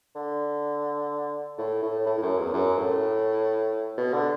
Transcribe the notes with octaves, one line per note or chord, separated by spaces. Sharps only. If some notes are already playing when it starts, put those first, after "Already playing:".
D3
A2
A2
A2
A2
F#2
E2
F#2
A2
B2
D3